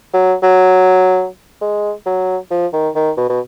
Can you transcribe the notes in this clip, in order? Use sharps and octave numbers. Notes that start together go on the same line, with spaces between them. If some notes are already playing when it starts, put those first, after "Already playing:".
F#3
F#3
G#3
F#3
F3
D#3
D#3
B2
B2